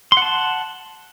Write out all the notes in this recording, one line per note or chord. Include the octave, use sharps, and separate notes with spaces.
F#5 A5 C6